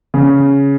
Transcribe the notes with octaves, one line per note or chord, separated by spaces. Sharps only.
C#3